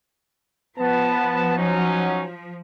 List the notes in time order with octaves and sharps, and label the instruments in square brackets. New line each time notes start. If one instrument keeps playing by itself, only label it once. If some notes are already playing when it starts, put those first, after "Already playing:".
[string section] F3 [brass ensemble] B3 A5
[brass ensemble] F#3 C#4 D#4